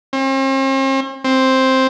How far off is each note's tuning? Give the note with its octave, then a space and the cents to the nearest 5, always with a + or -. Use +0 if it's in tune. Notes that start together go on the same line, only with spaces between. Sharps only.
C4 +45
C4 +5